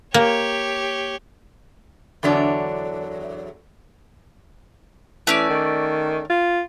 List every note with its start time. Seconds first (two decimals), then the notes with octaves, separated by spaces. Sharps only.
0.14 A#3 G4 C#5
2.23 E2 D3 F#3 D4
5.27 E3 A3 C#4 D5
5.50 D#3
6.30 F4